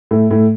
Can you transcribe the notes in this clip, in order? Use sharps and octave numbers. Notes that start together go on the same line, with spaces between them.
A2 A3
A2 A3